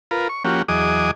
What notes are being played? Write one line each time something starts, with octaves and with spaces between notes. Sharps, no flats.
F4 A#4 B4
C#6
F3 A#3 C#4 F#4 G4
E2 F#3 G#4 D#5 D6 D#6